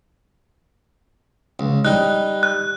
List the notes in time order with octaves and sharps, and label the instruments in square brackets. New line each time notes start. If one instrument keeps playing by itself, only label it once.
[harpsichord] C#2
[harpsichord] G3 D#4 [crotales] F#6
[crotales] F#6